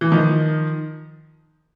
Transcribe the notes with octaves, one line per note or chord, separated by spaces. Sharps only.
E3
D#3 F3